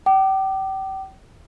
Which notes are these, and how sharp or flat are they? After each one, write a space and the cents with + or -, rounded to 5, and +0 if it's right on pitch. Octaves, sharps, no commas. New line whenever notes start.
G5 -35 D6 +25